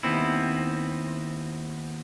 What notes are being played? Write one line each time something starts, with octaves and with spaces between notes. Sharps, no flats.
D#2 B3 C4 E4